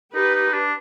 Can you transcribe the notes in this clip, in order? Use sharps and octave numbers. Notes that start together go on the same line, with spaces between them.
D#4 G4 B4
D#4
D4